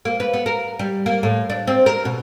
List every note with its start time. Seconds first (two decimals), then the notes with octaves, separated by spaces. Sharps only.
0.05 A#3
0.20 B4
0.34 B3
0.46 A#4
0.79 G3
1.06 A#3
1.23 A2
1.50 D4
1.68 C4
1.86 A#4
2.05 B2